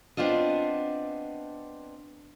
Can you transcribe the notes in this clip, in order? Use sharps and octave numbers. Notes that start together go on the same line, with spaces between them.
B3 C4 D4 F4 D#5